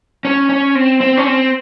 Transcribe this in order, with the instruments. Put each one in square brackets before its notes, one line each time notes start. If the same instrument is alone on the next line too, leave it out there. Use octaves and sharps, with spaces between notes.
[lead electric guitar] C#4
C#4
C4
C4
C#4
C4